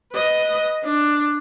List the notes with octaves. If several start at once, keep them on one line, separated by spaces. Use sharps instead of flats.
B4 D#5
D4